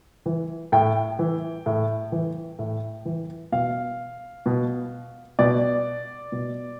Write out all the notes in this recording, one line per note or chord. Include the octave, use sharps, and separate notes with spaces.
E3
A2 G5
E3
A2
E3
A2
E3
B2 F5
B2
B2 D5
B2